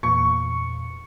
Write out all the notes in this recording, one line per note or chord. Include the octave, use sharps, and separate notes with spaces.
E2 A#2 C#6